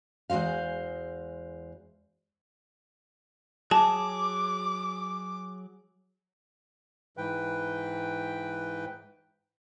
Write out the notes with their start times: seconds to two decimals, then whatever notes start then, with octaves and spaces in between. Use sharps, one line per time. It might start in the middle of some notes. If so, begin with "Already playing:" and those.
0.30 E2 G#3 F#4 C5 F5
3.71 F#3 G#4 A5 D6
7.17 G#2 E3 B4 G5